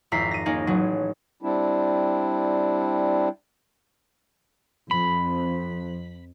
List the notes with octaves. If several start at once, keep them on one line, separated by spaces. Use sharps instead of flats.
G#1 F2 E4 A#5 B6 C7
A#6 D#7
A#3 C#4 D#4 G#4
A1 F#3 G#4
G3 C4 D4 E4
F2 B5